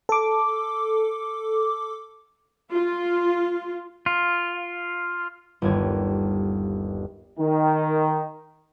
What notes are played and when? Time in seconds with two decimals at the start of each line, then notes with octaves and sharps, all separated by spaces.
0.09 A4 D6
2.71 F4
4.06 F4
5.62 G1 D#2 G#6
7.39 D#3